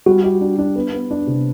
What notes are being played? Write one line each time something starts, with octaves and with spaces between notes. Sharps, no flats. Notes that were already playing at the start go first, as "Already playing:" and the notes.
G3 F#4
G4
D4
D4
B3
B3
D4
C3